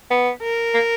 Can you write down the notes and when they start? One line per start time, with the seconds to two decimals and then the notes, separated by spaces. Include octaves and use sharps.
0.10 B3
0.42 A#4
0.74 A#3